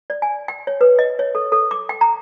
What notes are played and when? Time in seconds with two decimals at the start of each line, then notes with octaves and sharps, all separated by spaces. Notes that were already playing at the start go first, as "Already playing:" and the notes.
0.10 D5
0.22 G#5
0.48 G5
0.67 C#5
0.81 B4
0.99 D#5
1.19 C#5
1.35 A4
1.52 A4
1.71 D6
1.89 G5
2.01 A#5